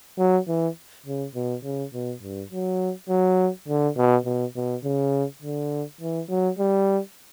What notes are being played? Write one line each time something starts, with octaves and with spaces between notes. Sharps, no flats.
F#3
E3
C#3
B2
C#3
B2
G2
F#3
F#3
D3
B2
B2
B2
C#3
D3
E3
F#3
G3